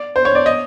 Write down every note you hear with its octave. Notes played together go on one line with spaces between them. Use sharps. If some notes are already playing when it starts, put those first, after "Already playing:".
Already playing: D5
C5
C#5
D5
D#5